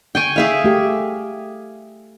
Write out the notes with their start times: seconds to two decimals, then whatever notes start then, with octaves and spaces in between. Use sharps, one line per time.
0.15 G5 G#5 C#6
0.36 G#4 E5 F5
0.64 A3 G4